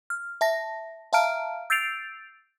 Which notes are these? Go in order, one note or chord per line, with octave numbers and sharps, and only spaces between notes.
F6
E5 A5 A#6
E5 F5 A5 A#5 F6 D7
E6 G6 A6 C7 D7 F7